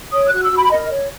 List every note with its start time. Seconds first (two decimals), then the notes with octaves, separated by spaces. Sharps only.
0.13 C#5 D#6
0.28 F#4 F#6
0.42 E6
0.52 F#4 B5
0.71 A#4 D#5
0.91 C#5